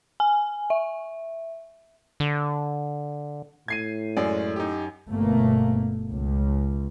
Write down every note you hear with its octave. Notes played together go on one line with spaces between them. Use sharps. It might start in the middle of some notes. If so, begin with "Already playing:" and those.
G#5
E5
D3
A2 G#6 C7 D#7
F#2 G#3 C#4 D5
D#4 G4
G1 B2 A3 A#3
C#2